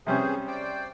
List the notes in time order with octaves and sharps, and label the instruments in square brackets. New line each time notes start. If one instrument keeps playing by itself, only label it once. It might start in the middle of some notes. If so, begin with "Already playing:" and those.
[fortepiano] C3 G3 C#4 [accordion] E3 G#4 C5
[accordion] C5 D5 G5